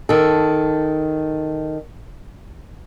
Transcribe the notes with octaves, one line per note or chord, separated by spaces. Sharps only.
D#3 A4